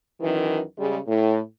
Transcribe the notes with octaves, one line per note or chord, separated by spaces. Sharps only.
F#2 D#3 E3
C#3 G3 G#3
A2